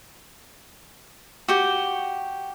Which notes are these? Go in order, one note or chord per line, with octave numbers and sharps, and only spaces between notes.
F#4 G4